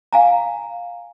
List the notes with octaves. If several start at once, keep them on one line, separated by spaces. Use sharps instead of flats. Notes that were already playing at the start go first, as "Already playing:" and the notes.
F5 G#5 A#5